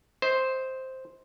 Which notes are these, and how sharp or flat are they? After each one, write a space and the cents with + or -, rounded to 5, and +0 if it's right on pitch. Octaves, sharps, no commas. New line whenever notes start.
C5 +0 D#5 +30